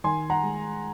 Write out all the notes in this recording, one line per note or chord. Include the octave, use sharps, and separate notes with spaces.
D#3 G#5 C6
F#5 A#5
G#3